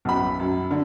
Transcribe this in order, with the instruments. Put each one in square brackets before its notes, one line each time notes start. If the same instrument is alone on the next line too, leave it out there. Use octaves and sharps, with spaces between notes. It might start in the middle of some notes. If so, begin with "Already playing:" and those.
[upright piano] B1 F#2 B5
F#2
D3